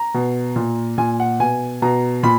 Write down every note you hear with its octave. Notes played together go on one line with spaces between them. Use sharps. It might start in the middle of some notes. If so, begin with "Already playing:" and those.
Already playing: A#5
B2
A#2
A#2 G#5
F#5
B2 G#5
B2 A#5
A#2 B5